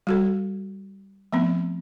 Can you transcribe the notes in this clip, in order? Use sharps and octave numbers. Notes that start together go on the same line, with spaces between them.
G3 F#4 A4
F3 A3 B3 C4